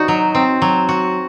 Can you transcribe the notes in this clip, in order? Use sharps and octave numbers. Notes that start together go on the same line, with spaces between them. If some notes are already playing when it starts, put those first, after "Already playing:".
Already playing: D#4 F#4
F#3
C4
F#3
F#4